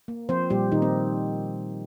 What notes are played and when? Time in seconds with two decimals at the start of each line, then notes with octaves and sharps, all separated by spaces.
0.08 A#3
0.29 F3 C4 C5
0.50 A#2 G3 G4
0.72 A#2 D#3 D#4
0.82 C4